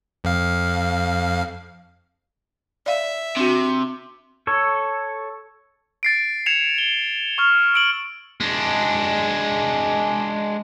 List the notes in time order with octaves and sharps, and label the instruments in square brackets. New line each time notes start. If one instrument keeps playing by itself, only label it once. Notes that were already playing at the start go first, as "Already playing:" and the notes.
[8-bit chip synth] F2 F5
[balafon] D5 F5 [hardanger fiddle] E5
[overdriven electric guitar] C3 [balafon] D4 F#4
[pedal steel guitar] A4 C#5
[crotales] A6 C7 D7
G#6 C7 C#7 E7 F7
G7
C#6 F6 F7
E6 D7 F#7
[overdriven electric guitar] G#3 D4